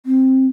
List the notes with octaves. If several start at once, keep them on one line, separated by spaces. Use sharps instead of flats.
C4